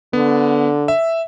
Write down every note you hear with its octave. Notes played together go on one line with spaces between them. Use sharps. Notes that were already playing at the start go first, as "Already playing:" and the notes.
D3 B3
E5